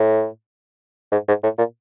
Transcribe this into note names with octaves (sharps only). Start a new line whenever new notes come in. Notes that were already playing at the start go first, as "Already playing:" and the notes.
Already playing: A2
G#2
G#2
A2
A#2